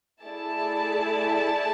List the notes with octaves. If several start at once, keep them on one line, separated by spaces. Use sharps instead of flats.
A3 E4 G#4 D5 A5